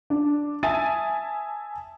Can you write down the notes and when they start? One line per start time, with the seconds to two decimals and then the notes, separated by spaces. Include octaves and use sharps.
0.10 D4
0.63 E5 G#5 A5 D#6 A6 D#7